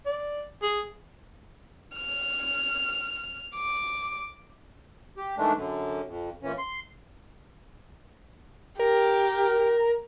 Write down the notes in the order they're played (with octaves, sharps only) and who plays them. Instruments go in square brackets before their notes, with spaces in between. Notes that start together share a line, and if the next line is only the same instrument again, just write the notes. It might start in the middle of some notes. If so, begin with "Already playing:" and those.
[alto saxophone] D5
G#4
[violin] F6
D6
[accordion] G4
D#3 E3 G#3 A3 D4
F#2 D3
F2
A#2 E3 C#4
C6
[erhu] G4 [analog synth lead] A#4